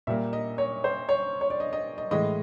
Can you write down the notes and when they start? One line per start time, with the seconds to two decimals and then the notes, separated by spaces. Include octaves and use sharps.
0.07 A#2 G3 A#3 E5
0.33 D#5
0.58 C#5
0.84 C5
1.09 C#5
1.41 C#5
1.50 D5
1.60 D#5
1.73 D#5
1.98 D#5
2.11 A2 E3 G#3 D#5